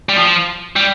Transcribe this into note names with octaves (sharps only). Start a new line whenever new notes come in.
G3
F3
G3